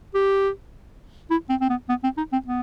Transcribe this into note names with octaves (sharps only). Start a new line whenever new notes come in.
G4
E4
C4
C4
B3
B3
C4
D#4
C4
B3